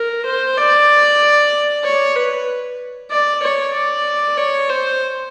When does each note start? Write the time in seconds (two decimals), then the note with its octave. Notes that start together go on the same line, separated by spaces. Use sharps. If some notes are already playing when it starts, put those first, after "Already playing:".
Already playing: A#4
0.25 C5
0.57 D5
1.84 C#5
2.15 B4
3.10 D5
3.42 C#5
3.74 D5
4.37 C#5
4.69 C5